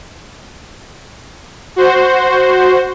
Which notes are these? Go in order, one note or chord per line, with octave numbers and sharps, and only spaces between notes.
F#4 C5